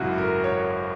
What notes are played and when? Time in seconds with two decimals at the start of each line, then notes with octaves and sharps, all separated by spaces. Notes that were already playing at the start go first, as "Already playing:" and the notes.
Already playing: G#1 F#2 C#3 G#3 E4 F#4
0.18 A#4
0.44 C#5